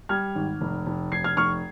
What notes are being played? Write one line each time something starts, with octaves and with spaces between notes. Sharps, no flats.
G3 F6 G#6
G#1
F1
F1
F1 G#6 C7
F6 G#6
F1 C#6 F6